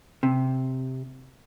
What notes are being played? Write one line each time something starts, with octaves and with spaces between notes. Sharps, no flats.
C3